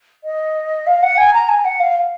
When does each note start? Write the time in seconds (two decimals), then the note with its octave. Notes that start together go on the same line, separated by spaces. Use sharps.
0.24 D#5
0.87 F5
1.02 F#5
1.17 G#5
1.34 A#5
1.49 G#5
1.65 F#5
1.80 F5